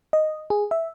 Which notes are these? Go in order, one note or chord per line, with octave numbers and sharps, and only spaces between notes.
D#5
G#4
E5